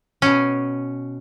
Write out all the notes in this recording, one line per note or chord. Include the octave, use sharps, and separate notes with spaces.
B2 C#4